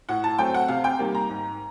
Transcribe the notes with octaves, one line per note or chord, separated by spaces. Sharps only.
A2 F#5
A5
F#3 A3 C4 G5
F#5
C3 F5
G5
D#3 G3 A#3
A#5
G#2